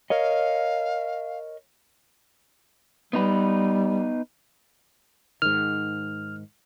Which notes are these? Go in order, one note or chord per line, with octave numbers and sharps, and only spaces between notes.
A#4 C#5 D#5 F5
G3 B3 D#4 B4
G#2 D#3 F6